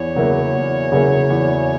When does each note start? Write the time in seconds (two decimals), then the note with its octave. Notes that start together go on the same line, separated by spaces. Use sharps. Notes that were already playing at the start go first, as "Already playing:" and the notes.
Already playing: E2 C#5
0.16 C#3 F#3 A#3 E4
0.54 E2
0.92 C#3 F#3 A#3 E4
1.30 E2